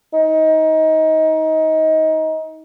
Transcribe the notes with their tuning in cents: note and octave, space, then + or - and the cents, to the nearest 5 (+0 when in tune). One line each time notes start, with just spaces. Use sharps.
D#4 +25